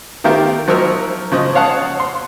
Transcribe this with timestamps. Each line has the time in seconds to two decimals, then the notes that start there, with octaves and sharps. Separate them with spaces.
0.24 D#3 A3 F4 G4 A#4
0.68 F3 F#3 D#4 A#4 E6 F6
1.32 C#3 F3 D#5
1.55 C#5 F5 F#5 A5 D#6
2.00 C6